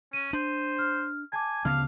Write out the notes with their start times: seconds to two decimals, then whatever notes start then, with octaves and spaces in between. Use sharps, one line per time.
0.13 C#4 D#7
0.33 D4 C5
0.79 F6
1.33 G#5 A5 D6
1.65 D2 C#3 B3 F5